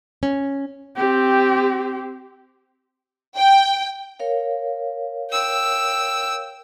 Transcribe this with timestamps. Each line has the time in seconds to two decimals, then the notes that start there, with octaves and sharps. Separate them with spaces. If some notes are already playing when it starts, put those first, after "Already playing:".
0.23 C#4
0.96 C4 G4
3.37 G5
4.20 A#4 C#5 F5
5.31 G5 E6